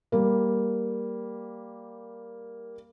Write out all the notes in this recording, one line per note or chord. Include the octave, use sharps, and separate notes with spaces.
G3 A#3